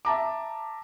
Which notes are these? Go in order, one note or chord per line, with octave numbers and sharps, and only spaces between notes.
E5 A5 A#5 D6